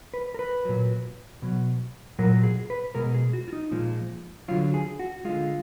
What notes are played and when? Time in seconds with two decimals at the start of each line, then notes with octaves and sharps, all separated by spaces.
0.14 B4
0.34 A#4
0.39 B4
0.65 A#2 F#3
1.42 B2 F#3
2.19 A#2 F#3 A#4
2.43 G#4
2.70 B4
2.95 B2 G#3 A#4
3.14 G#4
3.33 F#4
3.48 F4
3.53 D#4
3.71 A#2 F3 G#3
4.48 D3 F#3 F4
4.74 G#4
4.99 F#4
5.25 D3 G#3 F4